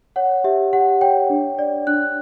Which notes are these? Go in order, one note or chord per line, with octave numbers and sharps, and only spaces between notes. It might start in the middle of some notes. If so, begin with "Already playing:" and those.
C#5 F#5
G4 E5
G4 F#5
C#5 G5
D4
D5
D4 F#6